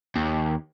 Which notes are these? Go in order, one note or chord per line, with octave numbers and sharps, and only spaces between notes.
D#2